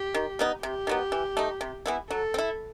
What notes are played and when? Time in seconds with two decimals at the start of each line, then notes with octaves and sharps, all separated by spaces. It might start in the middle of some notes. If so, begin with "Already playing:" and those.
Already playing: G4
0.14 D#3
0.39 G3 B3 D#4
0.63 C3 G4
0.87 D#3 F#3 B3
1.12 E3
1.37 A3 D#4
1.61 C3
1.86 E3 B3 E4
2.10 F#3 A4
2.34 C4
2.38 E4